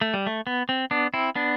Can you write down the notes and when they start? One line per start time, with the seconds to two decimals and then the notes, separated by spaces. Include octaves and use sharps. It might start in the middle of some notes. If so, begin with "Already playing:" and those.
0.01 A3
0.14 G3
0.27 A3
0.47 B3
0.69 C4
0.91 B3 D4
1.14 C4 E4
1.35 B3 D4